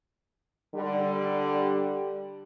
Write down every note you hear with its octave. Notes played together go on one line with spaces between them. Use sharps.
D3 G3